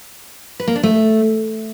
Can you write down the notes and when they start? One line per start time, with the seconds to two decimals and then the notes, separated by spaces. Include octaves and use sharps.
0.60 B4
0.67 A#3
0.75 D4
0.83 A3